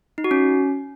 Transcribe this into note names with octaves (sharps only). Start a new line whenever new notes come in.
D#4
F#4
C#4